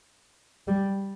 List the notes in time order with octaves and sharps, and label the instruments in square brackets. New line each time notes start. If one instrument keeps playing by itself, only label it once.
[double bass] G3